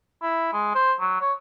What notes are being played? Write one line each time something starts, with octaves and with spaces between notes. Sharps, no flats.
E4
G#3
C5
F#3
C#5